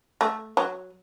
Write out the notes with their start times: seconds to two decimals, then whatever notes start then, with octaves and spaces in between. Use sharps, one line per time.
0.21 A3
0.57 F#3